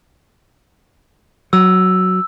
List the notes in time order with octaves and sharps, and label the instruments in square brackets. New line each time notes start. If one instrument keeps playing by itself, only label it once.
[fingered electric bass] F#3 [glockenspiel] E6